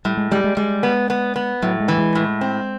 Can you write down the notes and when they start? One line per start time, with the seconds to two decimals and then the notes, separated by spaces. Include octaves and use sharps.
0.05 A2 G3
0.17 G#3
0.31 G3 G#3
0.44 G#3
0.57 G3 G#3
0.83 B3
1.10 B3
1.36 B3
1.62 A2 F#3
1.80 G#3
1.88 E3
1.98 G#3
2.15 A2
2.41 C4